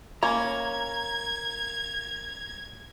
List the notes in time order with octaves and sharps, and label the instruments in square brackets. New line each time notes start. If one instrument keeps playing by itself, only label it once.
[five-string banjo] A#3 C#4 [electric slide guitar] A#5 [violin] G#6